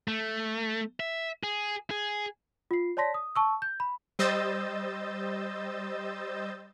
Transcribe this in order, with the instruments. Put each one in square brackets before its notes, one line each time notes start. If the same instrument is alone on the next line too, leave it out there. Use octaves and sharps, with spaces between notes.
[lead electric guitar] A3
E5
G#4
G#4
[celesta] F4 C7
C#5 D5 A5 C6 A#6 B6
D#6
A5 C#6 E6
G6
B5
[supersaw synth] G3 C5 D#5 E6 G6 A6